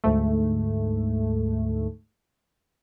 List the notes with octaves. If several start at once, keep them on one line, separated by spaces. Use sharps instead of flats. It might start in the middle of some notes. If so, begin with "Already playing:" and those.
D2 G#2 A3